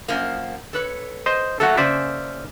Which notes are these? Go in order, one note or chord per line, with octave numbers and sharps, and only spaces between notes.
F#2 F3 A#3
A4 B4 C#5
C5 D#5
F#3 A3 A#3 F#4 A4
C#3 A#3 C#4 C5 D5 E5